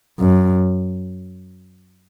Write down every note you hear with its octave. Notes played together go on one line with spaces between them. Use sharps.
F#2